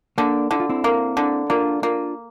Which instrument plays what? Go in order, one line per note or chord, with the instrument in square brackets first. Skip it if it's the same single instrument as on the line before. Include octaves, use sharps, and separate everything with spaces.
[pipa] D3 [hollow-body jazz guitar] A#3 D4
[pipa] D3 [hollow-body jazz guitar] E4
[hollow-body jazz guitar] F4
C4 E4
[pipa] A#3
D3
[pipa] A#3 [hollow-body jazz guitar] D4 F4
[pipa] A#3 [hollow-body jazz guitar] D4 F4